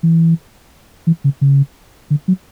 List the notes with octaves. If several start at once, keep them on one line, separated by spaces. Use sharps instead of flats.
E3
E3
C#3
C#3
D3
F#3